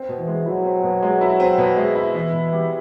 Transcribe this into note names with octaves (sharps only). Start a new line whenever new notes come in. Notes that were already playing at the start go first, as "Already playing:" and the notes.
Already playing: C4
B2
E3
G#3
F#3 E4
C4
B2
G#3
E4
C4
B2
G#3
E4
E3 B3
B2
G3